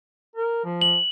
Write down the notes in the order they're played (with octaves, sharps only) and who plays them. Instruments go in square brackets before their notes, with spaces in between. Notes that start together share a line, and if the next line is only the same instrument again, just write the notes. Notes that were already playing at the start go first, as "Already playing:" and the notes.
[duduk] A#4
F3
[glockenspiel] F#7